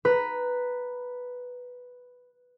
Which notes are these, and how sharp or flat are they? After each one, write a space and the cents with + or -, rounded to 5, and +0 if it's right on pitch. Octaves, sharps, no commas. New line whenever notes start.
B4 +0 A#5 +0